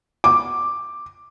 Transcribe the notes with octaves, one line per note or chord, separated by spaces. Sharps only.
D6